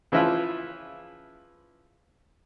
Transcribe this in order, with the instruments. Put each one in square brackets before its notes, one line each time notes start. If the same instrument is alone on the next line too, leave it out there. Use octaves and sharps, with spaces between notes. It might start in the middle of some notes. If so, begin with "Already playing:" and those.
[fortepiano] C#3 E3 F3 E4 F4